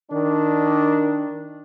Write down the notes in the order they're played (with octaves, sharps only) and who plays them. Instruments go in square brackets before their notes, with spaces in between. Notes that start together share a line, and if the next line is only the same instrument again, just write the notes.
[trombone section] D#3 D4